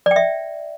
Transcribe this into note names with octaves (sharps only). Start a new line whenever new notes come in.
D5
G5
E5